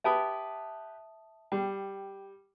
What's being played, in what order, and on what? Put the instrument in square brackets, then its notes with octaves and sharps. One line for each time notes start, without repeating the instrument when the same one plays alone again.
[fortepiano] G4 B4 [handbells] E5 A5 D#6
[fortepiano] G3 [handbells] G5